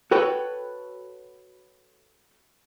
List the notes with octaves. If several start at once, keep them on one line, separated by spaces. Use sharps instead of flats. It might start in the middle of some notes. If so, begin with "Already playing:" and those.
F#4 A4 B4 C#5 G5